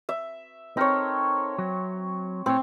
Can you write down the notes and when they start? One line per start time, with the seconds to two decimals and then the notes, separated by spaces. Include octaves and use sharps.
0.09 E5
0.77 C4 D#4 A4 A#4 C#5
1.58 F#3
2.46 A2 C4 C#5